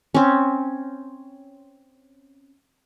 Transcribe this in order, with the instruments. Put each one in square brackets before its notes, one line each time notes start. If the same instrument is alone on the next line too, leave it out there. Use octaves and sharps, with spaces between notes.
[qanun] C4 C#4